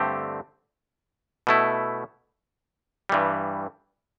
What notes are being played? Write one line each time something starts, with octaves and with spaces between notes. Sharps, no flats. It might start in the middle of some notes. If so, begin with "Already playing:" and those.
Already playing: G2 D3 A3 C4 G4
B2 A3 E4
G2 E3 G3